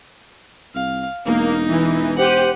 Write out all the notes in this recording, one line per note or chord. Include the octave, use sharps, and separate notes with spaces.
C2 F5
E1 A#3 D#4
E3
G4 C5 F#5 D#7